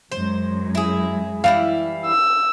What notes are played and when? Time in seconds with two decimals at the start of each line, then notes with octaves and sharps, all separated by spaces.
0.12 F#2 G#3 C5
0.75 E4 G#4
1.44 E3 G3 E4 F5
2.06 E6